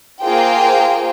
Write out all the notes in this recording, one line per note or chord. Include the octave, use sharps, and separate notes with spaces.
A#3 F4 G#4 C5 G5